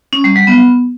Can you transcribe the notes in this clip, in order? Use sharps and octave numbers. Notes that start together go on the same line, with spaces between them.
C#4
G3
F#3
B3